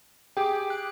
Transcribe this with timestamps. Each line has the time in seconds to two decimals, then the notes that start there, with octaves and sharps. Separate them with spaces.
0.37 G4 G#4 G5 D6
0.70 F#6